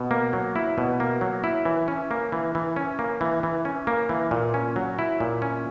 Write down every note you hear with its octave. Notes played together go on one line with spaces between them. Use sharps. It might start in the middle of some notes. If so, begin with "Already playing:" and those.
Already playing: B2
A#3
F#3
E4
B2
A#3
F#3
E4
E3
C#4
A#3
E3
E3
C#4
A#3
E3
E3
C#4
A#3
E3
A#2
C#4
F#3
E4
A#2
C#4